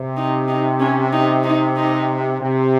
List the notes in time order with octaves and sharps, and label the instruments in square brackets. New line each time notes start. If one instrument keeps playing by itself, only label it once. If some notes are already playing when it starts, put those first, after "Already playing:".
Already playing: [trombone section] C3
[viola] D#4
D#4
C#4
D#4
D#4
D#4
[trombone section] C3